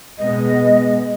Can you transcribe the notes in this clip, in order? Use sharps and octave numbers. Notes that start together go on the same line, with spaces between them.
B2 G#3 B3 D#5